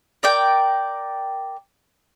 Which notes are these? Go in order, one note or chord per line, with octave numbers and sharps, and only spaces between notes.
A#4 D5 G5